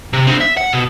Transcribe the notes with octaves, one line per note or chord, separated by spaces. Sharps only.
C3
D3 C4
E5
F#5
B2